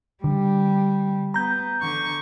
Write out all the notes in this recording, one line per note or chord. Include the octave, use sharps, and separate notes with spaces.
D3 G3
B3 A#5 G6
D3 C#6